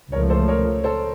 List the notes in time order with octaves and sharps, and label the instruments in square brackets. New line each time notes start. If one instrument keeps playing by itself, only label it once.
[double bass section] C#2 C#3 F3 A3 [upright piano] A#4 C#5
[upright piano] A4 C5
A#4 C#5
A4 C5